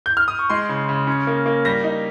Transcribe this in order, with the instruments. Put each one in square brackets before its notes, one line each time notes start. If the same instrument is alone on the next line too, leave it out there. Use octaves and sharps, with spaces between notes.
[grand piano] G6
F6
D#6
C#6
G#3 C6
C#3
C#3
C#4
A#3
A#3
G3 A#6
D#4